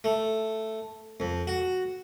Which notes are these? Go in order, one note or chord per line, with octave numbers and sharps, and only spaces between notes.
A3
F2
F#4